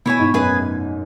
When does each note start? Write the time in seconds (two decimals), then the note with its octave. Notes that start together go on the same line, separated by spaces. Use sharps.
0.05 B2 E4 C#5 G#5
0.19 G#2
0.34 F#2 G#4 B4 G#5